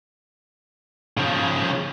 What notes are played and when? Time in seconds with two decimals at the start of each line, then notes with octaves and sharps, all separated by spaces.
1.17 C#3 F3